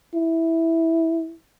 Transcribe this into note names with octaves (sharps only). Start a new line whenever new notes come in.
E4